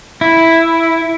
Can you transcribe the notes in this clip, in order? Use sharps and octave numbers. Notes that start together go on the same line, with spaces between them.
E4